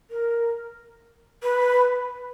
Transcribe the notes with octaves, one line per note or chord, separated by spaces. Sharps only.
A#4
B4